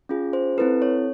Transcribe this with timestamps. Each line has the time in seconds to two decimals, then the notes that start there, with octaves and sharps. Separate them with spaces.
0.09 C#4 F4 G#4
0.33 C5
0.58 C4 E4 A4 B4
0.82 C#5